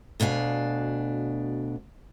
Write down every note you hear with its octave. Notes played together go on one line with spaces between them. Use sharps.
D2 B2 D4 F5 G#5